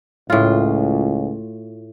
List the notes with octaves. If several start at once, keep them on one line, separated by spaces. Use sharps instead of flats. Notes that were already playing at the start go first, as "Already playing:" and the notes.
C#2 A2 F4